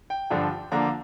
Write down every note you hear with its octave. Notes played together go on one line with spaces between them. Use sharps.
G5
G2 D3 F3 D4
D3 F3 A#3 D4 A#5